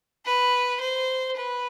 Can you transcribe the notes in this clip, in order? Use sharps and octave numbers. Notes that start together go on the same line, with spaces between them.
B4
C5
B4